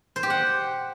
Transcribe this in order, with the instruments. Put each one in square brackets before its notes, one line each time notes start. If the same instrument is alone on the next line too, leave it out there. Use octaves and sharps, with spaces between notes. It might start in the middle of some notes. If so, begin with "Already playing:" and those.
[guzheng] C5
G4
F#5